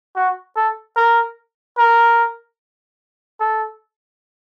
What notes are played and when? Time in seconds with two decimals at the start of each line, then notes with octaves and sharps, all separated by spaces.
0.16 F#4
0.56 A4
0.96 A#4
1.78 A#4
3.40 A4